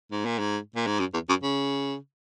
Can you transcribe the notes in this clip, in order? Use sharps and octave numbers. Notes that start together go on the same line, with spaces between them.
G#2
A#2
G#2
A#2
G#2
F#2
E2
F#2
C#3